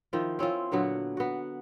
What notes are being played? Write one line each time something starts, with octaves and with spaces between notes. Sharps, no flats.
D#3 F3 E4 F4
C4 C#4 E4 F4
A#2 D3 F#3 B3
B3 F#4